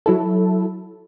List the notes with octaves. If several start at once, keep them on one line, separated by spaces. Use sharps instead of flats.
F#3 E4 A4